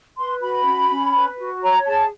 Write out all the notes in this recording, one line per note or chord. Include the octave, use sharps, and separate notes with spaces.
B4 C6
F#4 B5
C#4
C#4
B4
F#4
C#5 A#5
G#4 A5